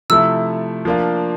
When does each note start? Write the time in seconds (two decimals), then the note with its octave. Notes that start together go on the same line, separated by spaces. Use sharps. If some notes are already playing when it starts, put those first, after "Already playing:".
0.10 C3 F3 A3 E4 A4 E6
0.85 F3 A#3 D4 F4